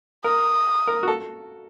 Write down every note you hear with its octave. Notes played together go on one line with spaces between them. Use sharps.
A#4 D#6
A#4
F#4
A4